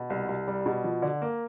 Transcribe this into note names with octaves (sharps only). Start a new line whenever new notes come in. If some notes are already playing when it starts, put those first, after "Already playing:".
Already playing: B2
C2
C2
G3
B2
F3
D3
A#3